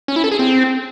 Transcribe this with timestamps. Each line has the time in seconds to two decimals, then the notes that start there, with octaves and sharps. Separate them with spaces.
0.08 C#4
0.16 E4
0.24 A4
0.32 G#4
0.39 C4